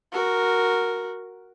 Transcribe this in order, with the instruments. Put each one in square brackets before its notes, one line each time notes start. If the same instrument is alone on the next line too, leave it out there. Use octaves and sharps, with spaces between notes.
[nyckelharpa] F#4 A#4